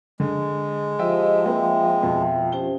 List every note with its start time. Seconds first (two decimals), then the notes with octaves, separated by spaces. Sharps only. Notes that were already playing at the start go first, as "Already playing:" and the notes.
0.20 D3 G#3
0.99 F3 G4 C5 D#5 E5 G5
1.45 A#3 C4 B4 E5 G5
2.03 F2 B2
2.52 C#4 G4 C5 G7